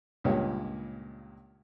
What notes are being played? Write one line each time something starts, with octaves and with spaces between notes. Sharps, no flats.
C#2 G2 A#2 G3 G#3 C#5